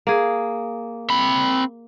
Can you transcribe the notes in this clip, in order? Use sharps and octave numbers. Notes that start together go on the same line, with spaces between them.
A#3 G#4
C4 B5